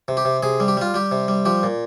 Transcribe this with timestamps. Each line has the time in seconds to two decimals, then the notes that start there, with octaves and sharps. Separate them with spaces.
0.08 C3
0.17 G4
0.25 C3
0.43 C3 G#4
0.60 G3
0.68 G4
0.77 G3 F4
0.94 G3 G4
1.12 C3
1.28 G3
1.45 F3 G4
1.63 A#2